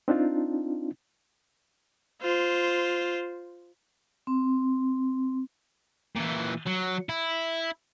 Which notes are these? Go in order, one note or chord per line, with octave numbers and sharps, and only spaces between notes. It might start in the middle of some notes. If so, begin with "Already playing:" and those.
C4 D4 D#4 F4
F4 C5
C4
A#2 E3
F#3
E4